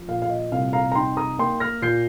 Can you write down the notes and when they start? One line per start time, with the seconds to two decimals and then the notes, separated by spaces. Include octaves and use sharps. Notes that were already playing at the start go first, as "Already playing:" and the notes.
Already playing: F3
0.08 A#2 F5
0.22 F5
0.29 D#5
0.52 C2 F5
0.73 F5 A#5
0.92 A#5
0.95 D#4 G5 C6
1.17 A#5 D#6
1.38 A#3 G5 C6
1.60 F6 A#6
1.82 A#2 G6 C7